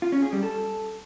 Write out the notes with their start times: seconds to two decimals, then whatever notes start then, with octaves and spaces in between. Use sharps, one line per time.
0.02 F4
0.12 C#4
0.22 G#4
0.33 G3
0.43 A4